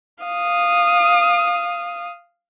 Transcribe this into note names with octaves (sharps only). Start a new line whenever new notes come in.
F5 D#6